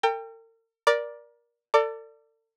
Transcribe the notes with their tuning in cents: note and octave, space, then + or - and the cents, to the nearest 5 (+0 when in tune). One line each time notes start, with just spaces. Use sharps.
A#4 -45 G5 +20
A#4 +25 D5 +0
A4 +40 D5 +0